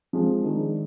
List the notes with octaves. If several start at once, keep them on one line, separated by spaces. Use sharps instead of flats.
F3 G#3 C4
D#3 G#3 D4